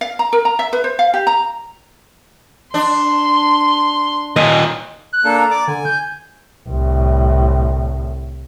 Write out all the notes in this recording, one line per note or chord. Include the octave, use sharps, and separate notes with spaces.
F5
A#5
A#4
A#5
E5
B4
C5
F5
G4
A#5
D4 C6
D#2 A#2 D#5
F#6
A#3 D4 A4
A#5
D5 D6
D3 G#5
G6
C2 A2